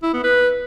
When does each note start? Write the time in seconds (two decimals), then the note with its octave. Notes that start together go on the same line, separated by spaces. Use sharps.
0.03 E4
0.14 B3
0.24 B4